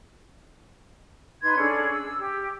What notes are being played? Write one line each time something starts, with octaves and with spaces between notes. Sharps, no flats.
D#4 B4 C6 G#6
C#4 D4 G#4 A4
E6
G4